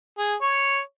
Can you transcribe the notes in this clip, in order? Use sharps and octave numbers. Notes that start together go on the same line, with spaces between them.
G#4
C#5